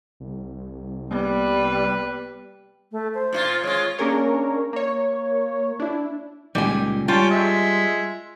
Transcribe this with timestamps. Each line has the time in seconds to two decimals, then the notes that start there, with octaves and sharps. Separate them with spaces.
0.20 C2
1.11 G3 A#3 B3 B4
2.92 A3
3.14 C5
3.33 A#2 E4 F4
3.64 G#3 F4 C#5
3.98 A#3 C#4 D4 G#4 A#4 C#5
4.73 A#3 C#5
5.80 D4 E4
6.55 C#2 A#2 D#3 G3 G#5
7.08 G3 C#4 F4 G5 A5
7.31 G#3 E5